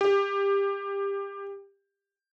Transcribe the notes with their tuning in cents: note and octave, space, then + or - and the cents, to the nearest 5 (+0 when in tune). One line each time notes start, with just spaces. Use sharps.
G4 +20